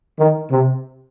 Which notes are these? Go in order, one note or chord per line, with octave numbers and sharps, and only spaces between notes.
D#3
C3